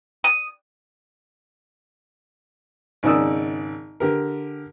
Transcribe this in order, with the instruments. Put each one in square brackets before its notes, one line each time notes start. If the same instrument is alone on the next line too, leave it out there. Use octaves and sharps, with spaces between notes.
[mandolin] D#6
[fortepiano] G#1 C#3 D#4 D5 D#6 E6
D3 G4 A#4